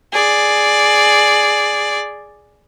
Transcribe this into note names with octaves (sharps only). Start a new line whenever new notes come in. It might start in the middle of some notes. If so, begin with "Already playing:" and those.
G#4 D5